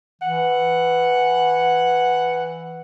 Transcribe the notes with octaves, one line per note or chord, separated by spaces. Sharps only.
E3 F#5